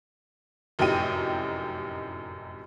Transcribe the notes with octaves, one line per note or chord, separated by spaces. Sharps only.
F1 F#2 A2 D#4 G4 D#7